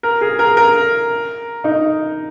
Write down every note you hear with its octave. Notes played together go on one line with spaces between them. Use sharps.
A#4
G#4
A#4
A#4
D#4